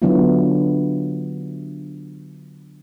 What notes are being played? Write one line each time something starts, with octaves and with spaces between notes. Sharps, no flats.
D3 F#3 B3 D4 E4 F4